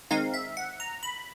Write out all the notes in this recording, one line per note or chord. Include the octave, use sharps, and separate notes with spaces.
D#3 G#3 C4 D#4 F5
E5
F#5
A#5
B5